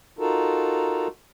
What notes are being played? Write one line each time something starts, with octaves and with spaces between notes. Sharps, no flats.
D#4 F4 F#4 A4 A#4